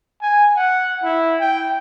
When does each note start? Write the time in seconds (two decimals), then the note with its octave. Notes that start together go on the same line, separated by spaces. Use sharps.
0.21 G#5
0.55 F#5
1.03 E4
1.40 G5